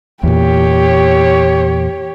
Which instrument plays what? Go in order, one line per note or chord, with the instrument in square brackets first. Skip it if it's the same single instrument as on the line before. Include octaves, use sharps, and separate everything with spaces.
[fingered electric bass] E2 A#2 [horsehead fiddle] G4 C#5